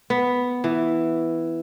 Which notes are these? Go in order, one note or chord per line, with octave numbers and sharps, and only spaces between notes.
B3
E3